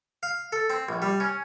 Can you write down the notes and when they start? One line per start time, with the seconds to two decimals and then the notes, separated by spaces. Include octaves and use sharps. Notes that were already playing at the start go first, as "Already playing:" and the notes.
0.23 F5
0.52 A4
0.70 C4
0.89 A#1
1.02 G3
1.20 C#4